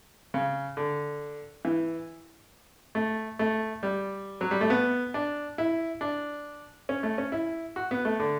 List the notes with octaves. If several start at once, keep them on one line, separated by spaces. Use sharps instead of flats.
C#3
D3
E3
A3
A3
G3
F#3
G3
A3
B3
D4
E4
D4
C#4
A3
C#4
E4
F#4
B3
A3
D3